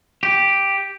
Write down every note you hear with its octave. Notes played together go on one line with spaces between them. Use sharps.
G4